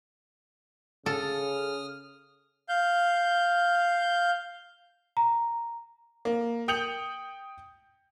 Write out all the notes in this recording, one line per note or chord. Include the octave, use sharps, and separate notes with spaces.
C#3 A4 D#6 F6
F5 G6
A#5
A#3
G5 D#6 G6 C#7 F7 F#7